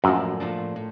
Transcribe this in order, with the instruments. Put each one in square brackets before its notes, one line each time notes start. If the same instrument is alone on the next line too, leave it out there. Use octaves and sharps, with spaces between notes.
[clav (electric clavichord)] F#2 [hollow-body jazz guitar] A2 F3 A#3 D4
[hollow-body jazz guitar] A2 F3 A#3 D4
A2